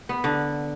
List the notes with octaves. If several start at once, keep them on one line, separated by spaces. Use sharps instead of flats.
B3
D3